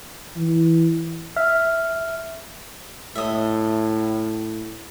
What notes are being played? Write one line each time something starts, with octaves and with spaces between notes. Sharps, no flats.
E3
E5 F6
A2 D#5 E5